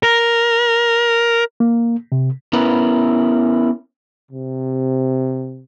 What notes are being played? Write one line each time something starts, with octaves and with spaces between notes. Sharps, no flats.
A#4
A#3
C3
B3 C#4 E4 A#4 B4
C3